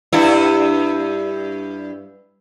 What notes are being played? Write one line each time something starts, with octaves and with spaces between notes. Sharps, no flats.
G2 E4